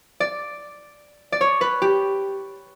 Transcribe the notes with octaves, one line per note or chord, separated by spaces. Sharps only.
D5
D5
C#5
B4
G4